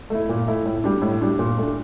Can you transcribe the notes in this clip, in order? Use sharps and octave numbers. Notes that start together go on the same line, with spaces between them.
A3 E4
A#2
A3 E4
A2
G3 D4
A2
G3 D4
A#2
A3 D4